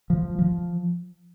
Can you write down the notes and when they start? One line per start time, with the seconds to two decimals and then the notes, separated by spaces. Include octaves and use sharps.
0.10 F3
0.39 F3